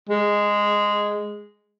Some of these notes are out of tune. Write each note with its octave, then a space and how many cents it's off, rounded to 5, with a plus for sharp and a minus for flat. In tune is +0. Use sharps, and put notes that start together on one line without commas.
G#3 -5